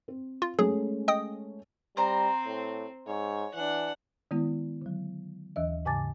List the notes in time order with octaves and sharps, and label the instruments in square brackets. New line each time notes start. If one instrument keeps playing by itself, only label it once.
[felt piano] C4
[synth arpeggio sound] F4
[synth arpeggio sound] F#3 G#4 [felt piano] G#3 A3 C#4
[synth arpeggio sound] D#5 G5 D#6
[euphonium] G3 [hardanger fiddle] C4 [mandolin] C5 A#5
[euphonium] A2
[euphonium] G#2 [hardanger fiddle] C#5
[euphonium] E3 [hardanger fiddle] D4 F#5
[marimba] D#3 G#3 B3 E4
D3 F#3
D#2 E3 D#5 E5
G#2 C#3 G#5 A5 D6 A6